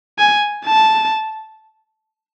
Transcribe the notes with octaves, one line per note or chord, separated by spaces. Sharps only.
G#5
A5